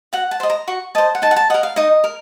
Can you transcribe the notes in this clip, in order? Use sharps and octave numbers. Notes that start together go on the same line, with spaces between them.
F#4 F#5
A5
C5 D#5
A#5
F#4 C#6
C5 D#5 A5
F#5
D#4 A5
F#5
A5
A#4 D#5 F#5
F5
D#4 D#5
A#4